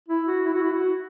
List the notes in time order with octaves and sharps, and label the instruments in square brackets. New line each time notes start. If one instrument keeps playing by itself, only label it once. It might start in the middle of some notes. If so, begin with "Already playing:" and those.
[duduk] E4
F#4
E4
F#4
E4
F#4